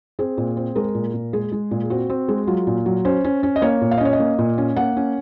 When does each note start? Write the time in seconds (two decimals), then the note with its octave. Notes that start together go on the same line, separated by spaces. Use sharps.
0.19 C4 G#4
0.38 A#2
0.57 C4
0.75 G#3 A#4
0.95 A#2
1.14 A#2
1.33 G#3 G#4
1.52 G#3
1.71 A#2
1.90 C4 F#4
2.10 C4
2.28 G#3
2.47 F#3 F4
2.67 A#2
2.86 F#3
3.05 C#4 C5
3.24 C#4
3.43 C#4
3.56 D#5
3.62 A#3 C#5
3.81 A#2
3.91 F5
3.98 D#5
4.01 C#4 C#5
4.13 D#5
4.20 A#3
4.38 A#2
4.58 C#4
4.76 A#3 F#5
4.97 C#4